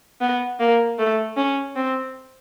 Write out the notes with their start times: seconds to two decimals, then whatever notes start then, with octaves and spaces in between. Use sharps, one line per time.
0.21 B3
0.60 A#3
0.99 A3
1.37 C#4
1.76 C4